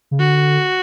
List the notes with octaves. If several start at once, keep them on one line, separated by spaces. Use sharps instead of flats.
C#3
D3 F#4